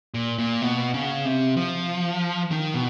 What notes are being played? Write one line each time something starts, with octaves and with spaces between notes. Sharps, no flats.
A#2
A#2
B2
C#3
C3
F3
D#3
B2